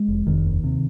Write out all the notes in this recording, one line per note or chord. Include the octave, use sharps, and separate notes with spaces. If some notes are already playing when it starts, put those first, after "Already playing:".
Already playing: G#3
F1
F1 D#3
D#2
C3